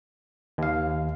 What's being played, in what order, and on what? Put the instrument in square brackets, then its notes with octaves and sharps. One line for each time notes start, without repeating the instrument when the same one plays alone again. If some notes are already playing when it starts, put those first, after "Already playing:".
[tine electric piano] D#2 F5